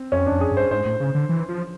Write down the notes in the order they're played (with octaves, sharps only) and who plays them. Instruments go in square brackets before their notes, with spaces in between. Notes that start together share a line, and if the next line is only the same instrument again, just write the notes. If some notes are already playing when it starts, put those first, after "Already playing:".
Already playing: [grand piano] C4
[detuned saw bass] F2 [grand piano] C#4
[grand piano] D4
[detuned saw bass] F2
[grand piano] G#4
[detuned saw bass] G2
[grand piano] C5
[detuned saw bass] G#2 [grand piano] C5
[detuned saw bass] A2
C#3
D3
E3
F3